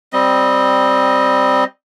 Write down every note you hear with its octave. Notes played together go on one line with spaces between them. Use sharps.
G3 C4 D#5